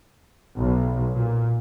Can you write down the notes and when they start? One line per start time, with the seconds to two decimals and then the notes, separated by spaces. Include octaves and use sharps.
0.57 B1
1.14 A#2